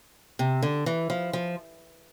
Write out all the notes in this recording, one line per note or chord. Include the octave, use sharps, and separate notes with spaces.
C3
D3
E3
F3
F3